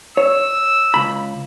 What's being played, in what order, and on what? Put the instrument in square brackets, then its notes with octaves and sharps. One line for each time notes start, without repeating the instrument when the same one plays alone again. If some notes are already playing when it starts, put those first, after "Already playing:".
[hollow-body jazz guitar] C#5 [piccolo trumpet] E6
[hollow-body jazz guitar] C#2 B5